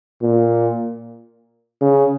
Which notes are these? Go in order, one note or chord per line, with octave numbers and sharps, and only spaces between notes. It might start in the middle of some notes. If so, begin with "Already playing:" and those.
A#2
C#3